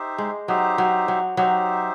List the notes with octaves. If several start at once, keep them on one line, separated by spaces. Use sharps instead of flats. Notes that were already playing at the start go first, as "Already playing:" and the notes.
Already playing: D#4 G4 C5 E5
G#3
F#3 D#4 G4 C5 E5
F#3
F#3
F#3 D#4 G4 C5 E5